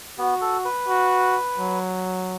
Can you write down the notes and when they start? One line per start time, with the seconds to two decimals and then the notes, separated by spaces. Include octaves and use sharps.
0.18 B3 F#4
0.41 A4
0.65 B4
0.88 F#4
1.58 F#3